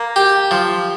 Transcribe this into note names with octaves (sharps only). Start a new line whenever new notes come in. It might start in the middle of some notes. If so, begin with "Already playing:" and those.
Already playing: A#3
G4
F3